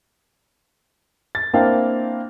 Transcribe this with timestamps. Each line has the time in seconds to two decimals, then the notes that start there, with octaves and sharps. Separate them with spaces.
1.35 A6
1.54 A#3 C4 D4 E4 F5 G5